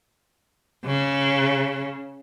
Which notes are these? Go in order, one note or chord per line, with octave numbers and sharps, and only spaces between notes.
C#3